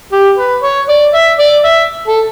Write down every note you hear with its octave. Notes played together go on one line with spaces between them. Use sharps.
G4
B4
C#5
D5
E5
D5
E5
A4